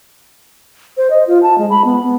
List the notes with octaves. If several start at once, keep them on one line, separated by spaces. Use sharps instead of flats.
C5
D#5
F4
A5
G#3
B5
B3
B3